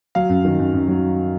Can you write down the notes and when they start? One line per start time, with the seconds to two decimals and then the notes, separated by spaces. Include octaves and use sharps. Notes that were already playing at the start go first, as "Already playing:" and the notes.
0.15 F#3 F5
0.29 F#2
0.45 D#3
0.59 F#2
0.74 F#2
0.88 F#3